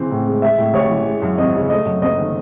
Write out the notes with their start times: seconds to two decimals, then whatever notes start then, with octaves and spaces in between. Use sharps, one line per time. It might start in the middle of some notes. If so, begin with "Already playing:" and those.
Already playing: C#3 E3 C4
0.11 A2
0.27 G#3
0.42 G#3 E5
0.58 A2
0.74 A1 C#5
0.90 E3
1.07 G#3
1.22 F#2
1.38 G#1 D#5
1.55 C#3
1.70 A3 D#5
1.85 F#2
2.01 F#1 D#5
2.18 D#3